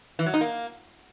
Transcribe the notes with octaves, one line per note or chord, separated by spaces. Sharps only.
E3
F#3
D#4
A#3